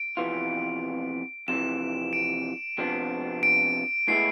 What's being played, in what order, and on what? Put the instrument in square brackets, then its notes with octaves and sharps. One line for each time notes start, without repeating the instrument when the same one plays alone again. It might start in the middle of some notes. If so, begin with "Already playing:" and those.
Already playing: [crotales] D7
[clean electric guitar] F2 C3 E3 B3 F4
[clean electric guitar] F2 C3 E3 [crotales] E7
[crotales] D7
[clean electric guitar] F2 C3 F3 B3 D4
[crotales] D7
[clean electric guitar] A2 G#3 B3 E4 [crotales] C7